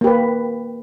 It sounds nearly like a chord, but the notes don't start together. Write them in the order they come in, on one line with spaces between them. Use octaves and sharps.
A#3 G4 B4